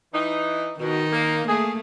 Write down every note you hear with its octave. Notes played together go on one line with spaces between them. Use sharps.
E3 D#4
B2 D#3 D#4
A#3
A3 A#3 G#4